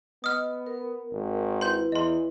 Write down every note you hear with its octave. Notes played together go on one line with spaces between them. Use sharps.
B3 D#5 D#6 F6
A#4
G#1
E4 B4 C6 G6
E2 D#5 C6